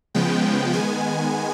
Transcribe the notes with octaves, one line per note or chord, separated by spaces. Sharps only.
C#3 F3 G#3 B3 G5
D#3 G#3 B3 G#5